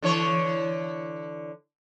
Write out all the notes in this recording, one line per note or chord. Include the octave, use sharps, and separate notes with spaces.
D3 E3 C#5